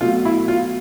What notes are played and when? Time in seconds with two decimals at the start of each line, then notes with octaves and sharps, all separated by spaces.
0.01 B2 F#3 A3 F4
0.25 E4
0.48 F4